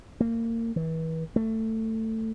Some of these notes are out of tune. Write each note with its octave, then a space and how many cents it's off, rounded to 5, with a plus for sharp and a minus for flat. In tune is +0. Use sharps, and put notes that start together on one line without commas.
A#3 -30
E3 -35
A3 +15